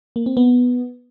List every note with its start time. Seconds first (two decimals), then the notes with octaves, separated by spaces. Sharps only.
0.16 A#3
0.26 C4
0.37 B3